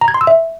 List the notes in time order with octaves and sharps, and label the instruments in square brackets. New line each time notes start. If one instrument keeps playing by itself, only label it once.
[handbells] A#5
G#6
C6
E6
E5